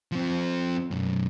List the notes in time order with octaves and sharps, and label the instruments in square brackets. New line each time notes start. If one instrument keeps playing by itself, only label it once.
[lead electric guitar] F3 C4
B1 F#2